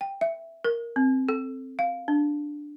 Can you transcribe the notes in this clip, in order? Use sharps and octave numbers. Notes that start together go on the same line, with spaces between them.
G5
E5
A#4
C4
A4
F5
D4